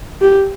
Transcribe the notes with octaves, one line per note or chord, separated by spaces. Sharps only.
G4